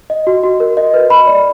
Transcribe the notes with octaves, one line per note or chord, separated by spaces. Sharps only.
D#5
F#4
F#4
A#4
D#5
B4
B5
D5